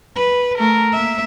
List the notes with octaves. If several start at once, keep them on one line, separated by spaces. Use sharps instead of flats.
B4
A3 A#4
A#3 E5